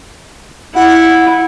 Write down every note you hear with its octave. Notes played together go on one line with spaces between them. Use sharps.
E4 F#5